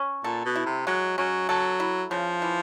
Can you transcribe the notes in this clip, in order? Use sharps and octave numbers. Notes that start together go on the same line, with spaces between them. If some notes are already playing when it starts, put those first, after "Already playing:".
Already playing: C#4
A#2 A4
B2
E4
C3
F#3 G#3
F#3 C#4
F#3 A4
E4
C#3 F3
E3